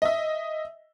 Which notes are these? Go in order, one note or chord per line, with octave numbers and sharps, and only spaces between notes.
D#5 E5